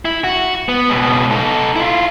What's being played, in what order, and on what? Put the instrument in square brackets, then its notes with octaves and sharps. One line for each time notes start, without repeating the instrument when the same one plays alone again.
[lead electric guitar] E4
F#4
B3
C#2 B2
D#4 A4
E4 F4